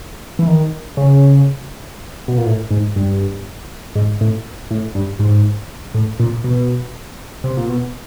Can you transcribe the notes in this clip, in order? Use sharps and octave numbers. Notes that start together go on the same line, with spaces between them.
E3
D#3
C#3
B2
A#2
A2
G#2
G2
G#2
A2
A2
G2
G#2
A2
A#2
B2
C3
A#2
B2